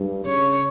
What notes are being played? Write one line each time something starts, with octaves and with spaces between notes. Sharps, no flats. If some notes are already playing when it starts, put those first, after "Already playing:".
Already playing: G2
C#3 C#5